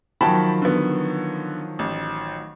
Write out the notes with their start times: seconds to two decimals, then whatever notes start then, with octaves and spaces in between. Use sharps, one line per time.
0.21 D#3 F3 F#3 G5 A5 B5
0.62 D3 B3
1.79 A1